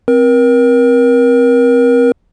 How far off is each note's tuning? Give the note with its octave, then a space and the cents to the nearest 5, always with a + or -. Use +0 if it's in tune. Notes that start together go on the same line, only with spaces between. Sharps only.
C4 +0 A#4 +35